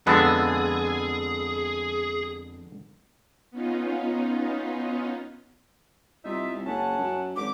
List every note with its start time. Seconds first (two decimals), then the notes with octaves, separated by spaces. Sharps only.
0.07 F2 D3 G#3 B3 G#4 B5 E6 A6
3.51 B3 C#4 D#4 F4
6.25 C2 D#4 F4 E5
6.53 C2
6.66 F#1 C#4 F#5 A5
6.98 F#2
7.36 G#1 D6